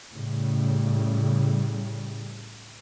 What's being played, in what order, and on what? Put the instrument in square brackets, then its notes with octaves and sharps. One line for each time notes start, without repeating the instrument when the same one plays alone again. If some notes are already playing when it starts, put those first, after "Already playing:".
[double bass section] A2 C#3 G3